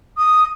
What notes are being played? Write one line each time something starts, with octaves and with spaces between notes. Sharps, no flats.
D#6